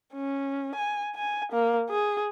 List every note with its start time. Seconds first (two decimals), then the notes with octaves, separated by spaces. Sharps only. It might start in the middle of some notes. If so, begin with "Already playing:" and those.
0.14 C#4
0.75 G#5
1.15 G#5
1.52 A#3
1.89 G#4